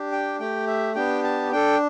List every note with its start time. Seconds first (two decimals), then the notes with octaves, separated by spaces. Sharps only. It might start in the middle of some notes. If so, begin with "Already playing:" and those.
Already playing: D4 G4
0.12 G5
0.39 A3 G4 G5
0.67 E5
0.95 B3 D4 G4 G5
1.24 A5
1.52 D4 A4 G5